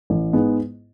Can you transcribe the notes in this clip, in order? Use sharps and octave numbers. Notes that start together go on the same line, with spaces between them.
A1
G#2 G#3 B3